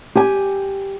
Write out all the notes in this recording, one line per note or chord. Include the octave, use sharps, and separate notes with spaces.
G4 G#5